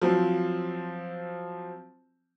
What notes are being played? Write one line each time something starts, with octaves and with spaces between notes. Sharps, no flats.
F3 F#3 C4